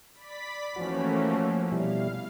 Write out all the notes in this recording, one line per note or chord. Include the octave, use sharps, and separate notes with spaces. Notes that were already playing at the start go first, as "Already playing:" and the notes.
D5 B5 B6
E3 F3 A3 A#3 C#4 F#4
B2 G3 E4 F5